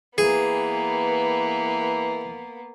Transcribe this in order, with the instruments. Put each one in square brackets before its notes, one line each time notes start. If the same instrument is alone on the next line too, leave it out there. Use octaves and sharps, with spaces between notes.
[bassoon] E3 [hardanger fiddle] A#3 B3 [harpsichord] G#4